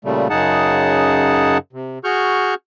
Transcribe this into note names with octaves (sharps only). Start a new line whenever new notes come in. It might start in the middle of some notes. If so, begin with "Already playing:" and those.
A#2 C#3 G3 A3
F#2 C#3 D#4 G#4 F#5 A5
C3
F#4 G#4 C#6 F6 G6